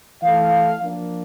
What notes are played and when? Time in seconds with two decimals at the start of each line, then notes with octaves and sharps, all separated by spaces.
0.22 E3 A3 E4 F5
0.81 F3 A#3 D4